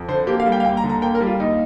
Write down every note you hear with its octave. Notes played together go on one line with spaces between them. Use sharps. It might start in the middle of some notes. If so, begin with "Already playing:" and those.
Already playing: F2
D3 C5
A#3 G4
F5
G3
G5
F5
D#2 G5
A#5
D3
A#5
A#3 G5
A#4
G3
F4
D#2 D#4